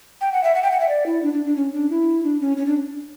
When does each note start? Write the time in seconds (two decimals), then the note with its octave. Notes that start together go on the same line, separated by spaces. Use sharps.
0.21 G5
0.33 F#5
0.44 E5
0.55 F#5
0.63 G5
0.72 F#5
0.80 E5
0.89 D5
1.06 E4
1.23 D4
1.33 D4
1.45 D4
1.56 C#4
1.73 D4
1.90 E4
2.24 D4
2.41 C#4
2.57 C#4
2.67 D4